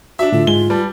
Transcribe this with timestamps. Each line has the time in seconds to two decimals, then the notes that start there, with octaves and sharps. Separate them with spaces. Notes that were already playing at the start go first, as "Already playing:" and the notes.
0.19 D4 F#4 E5
0.32 A2 D3 F4
0.47 G#2 G#3 G#5 G7
0.70 G3 B4 A5